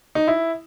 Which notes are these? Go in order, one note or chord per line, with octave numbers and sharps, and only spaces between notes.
D#4
E4